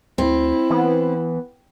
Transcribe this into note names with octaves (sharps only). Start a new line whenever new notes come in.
D2 C4 E4
E3 B3